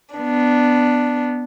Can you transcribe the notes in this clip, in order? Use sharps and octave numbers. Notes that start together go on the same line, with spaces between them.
B3 D4